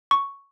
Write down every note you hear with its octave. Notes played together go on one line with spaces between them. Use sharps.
C#6